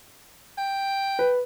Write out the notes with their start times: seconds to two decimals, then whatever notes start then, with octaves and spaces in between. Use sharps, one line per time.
0.58 G5
1.19 B4